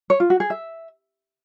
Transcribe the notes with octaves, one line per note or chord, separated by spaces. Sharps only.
C#5
F4
F#4
G#4
E5